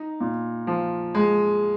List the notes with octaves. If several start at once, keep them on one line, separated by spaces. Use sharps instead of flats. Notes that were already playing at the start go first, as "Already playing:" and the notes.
Already playing: D#4
A#2
F3
G#3